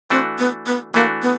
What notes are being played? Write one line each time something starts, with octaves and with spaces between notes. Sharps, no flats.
E3 A3 C4 D4 F#4
B3
B3
E3 A3 A#3 D4 F#4
B3